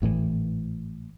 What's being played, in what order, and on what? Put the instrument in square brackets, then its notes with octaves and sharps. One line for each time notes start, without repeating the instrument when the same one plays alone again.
[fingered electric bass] G#1 A2 C3 E3